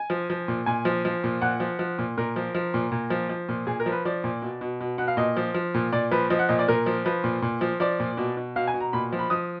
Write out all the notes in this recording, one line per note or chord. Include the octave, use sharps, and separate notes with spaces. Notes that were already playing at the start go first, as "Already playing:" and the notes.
Already playing: G#5
F3
F3
A#2
A#2 G#5
F3
F3
A#2
A#2 F#5
F3
F3
A#2
A#2 A#4
F3
F3
A#2
A#2
F3
F3
A#2
A#2 G#4
A#4
F3
B4
F3 D5
A#2
B2
B2
B2
B2 F#5
F5
A#2 D#5
F3
F3
A#2
A#2 D5
F3 B4
F3 D#5
F#5
A#2 D#5
D5
A#2 A#4
F3
F3 B4
A#2
A#2
F3
F3 D5
A#2
B2
B2
B2 F5
G#5
B2
A#5
A#2 B5
F3
B5
F3 D#6